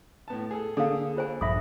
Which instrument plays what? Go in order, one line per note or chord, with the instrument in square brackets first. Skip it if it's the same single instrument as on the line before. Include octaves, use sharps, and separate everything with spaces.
[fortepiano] A2 B3 A5
G#4 A4
[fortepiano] D3 [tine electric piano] A#3 G#4 [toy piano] A4 F5
[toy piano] F4 C5 G#5
[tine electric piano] A#1 G2 B5 [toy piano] E5 D#6